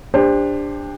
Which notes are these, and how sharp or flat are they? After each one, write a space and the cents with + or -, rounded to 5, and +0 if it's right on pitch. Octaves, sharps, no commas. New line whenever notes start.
D4 +0 G4 +30 C5 +0